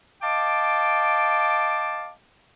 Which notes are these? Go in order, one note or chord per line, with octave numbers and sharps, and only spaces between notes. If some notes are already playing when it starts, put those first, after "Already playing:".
D#5 F5 G5 A5 D6